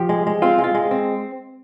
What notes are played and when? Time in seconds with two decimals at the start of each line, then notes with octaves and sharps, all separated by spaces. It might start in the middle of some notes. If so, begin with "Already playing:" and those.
Already playing: F3 G4
0.09 G#3
0.27 G#3
0.42 C4 F4
0.58 G#3
0.64 F4
0.75 G#3
0.91 C4